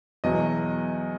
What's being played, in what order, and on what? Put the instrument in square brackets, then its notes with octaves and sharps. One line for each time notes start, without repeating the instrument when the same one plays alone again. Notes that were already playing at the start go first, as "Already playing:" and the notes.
[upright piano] E2 B2 F#3 D#5